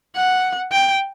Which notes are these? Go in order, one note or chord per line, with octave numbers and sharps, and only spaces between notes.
F#5
G5